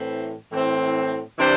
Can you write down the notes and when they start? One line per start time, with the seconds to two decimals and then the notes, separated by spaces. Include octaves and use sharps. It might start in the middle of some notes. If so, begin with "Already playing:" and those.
Already playing: A2 E3 C4
0.51 A2 E3 C4
1.38 C3 E3 G3 D4 C5